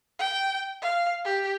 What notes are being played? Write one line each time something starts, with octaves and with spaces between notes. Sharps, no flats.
G5
F5
G4